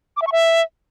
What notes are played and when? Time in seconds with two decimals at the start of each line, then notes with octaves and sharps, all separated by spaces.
0.17 D6
0.22 E5
0.27 C#6
0.32 E5